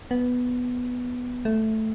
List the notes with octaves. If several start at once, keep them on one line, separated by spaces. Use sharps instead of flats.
B3
A3